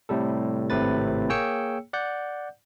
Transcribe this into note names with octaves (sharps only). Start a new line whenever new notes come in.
A2 C3 G3 A4
G#1 A2 C3 B4 A6
A#3 G#4 C#5 G5 E6 C#7
D5 F#5 G6